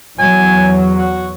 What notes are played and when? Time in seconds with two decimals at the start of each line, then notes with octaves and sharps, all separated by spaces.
0.19 E2 F#3 G#5
0.97 F#4